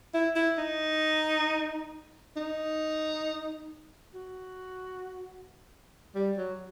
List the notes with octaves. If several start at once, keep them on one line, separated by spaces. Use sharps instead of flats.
E4
E4
D#4
D#4
F#4
G3
F#3